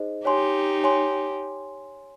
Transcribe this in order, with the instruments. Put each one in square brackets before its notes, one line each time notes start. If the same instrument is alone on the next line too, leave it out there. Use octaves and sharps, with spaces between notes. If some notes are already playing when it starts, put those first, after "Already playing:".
Already playing: [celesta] D#4 G#4 C5 D#5
[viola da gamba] D#4 G4 [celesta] C#5 G#5 C6
[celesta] C#5 G#5 C6